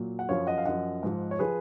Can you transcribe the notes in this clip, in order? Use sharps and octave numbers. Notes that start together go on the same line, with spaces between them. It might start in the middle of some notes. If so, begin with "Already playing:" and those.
Already playing: A#2 F#3
F#5
F#2 F3 C#5 F5
D#5 F#5
F5
F#2 F3 D#5 F#5
G#2 F3
C#5
F3 G#4 B4